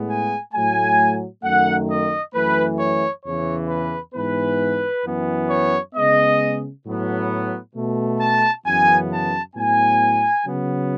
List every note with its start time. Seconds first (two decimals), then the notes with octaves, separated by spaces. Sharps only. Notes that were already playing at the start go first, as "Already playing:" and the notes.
Already playing: A2 G#3 B3
0.09 G#5
0.54 A2 F#3 A3 G#5
1.44 F#2 D#3 A3 F#5
1.89 D#5
2.33 F#2 E3 A3 B4
2.79 C#5
3.24 E2 C#3 E3 C#5
3.69 B4
4.14 G#2 E3 B3 B4
5.04 F#2 E3 B3
5.50 C#5
5.95 C#3 G#3 B3 D#5
6.85 A2 F#3 B3
7.75 B2 A3
8.20 A5
8.65 F#2 C#3 E3 B3 G#5
9.10 A5
9.56 A2 F#3 B3 G#5
10.46 C#3 F#3 B3